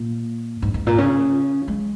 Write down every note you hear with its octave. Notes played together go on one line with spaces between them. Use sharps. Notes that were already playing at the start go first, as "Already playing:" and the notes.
Already playing: A#2
G#2
G#2
A#2
C#3
G#3